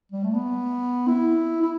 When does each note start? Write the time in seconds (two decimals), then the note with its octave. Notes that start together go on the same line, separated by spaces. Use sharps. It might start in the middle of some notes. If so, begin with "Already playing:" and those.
0.12 G3
0.24 A3
0.34 B3
1.08 E4
1.62 E4